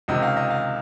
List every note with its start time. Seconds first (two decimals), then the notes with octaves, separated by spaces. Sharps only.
0.08 C#2 C3 D#3 D#5
0.22 F5
0.37 D#5
0.51 F5